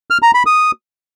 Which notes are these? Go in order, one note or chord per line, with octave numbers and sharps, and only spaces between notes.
F6
A#5
B5
D#6